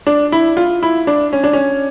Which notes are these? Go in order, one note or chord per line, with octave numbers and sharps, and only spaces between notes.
D4
E4
F4
E4
D4
C#4
D4
C#4